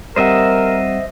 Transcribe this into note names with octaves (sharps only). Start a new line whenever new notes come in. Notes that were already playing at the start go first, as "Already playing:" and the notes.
G3 C4 A#4 C5 D#5 E5 F#5